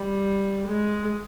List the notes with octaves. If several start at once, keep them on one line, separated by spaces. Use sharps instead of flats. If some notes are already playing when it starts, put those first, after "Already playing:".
Already playing: G3
G#3